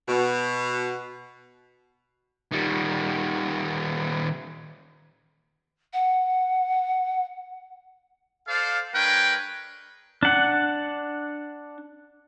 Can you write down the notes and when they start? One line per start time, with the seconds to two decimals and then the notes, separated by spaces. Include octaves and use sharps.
0.08 B2
2.52 D#3 G3
5.93 F#5
8.48 A4 C5 D5 F5
8.95 G#3 D4 A#4 B4 C#5 G5
10.23 D4 F#5